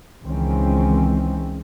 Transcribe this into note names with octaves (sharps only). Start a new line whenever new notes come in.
C#2 D#3 E3 G#3 C4 C#4